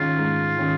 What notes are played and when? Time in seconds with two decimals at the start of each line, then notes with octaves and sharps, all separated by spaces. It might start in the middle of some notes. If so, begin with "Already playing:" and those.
Already playing: G#2 D#3 C#4 F4 G#4
0.18 G#2
0.57 D#3 C#4 G#4